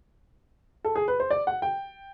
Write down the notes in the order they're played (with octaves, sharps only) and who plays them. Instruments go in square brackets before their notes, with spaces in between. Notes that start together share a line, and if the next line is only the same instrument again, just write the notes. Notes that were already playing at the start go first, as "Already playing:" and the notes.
[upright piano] A4
G#4
B4
C5
D5
F#5
G5